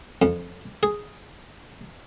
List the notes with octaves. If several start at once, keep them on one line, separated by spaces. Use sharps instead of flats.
F2
G#4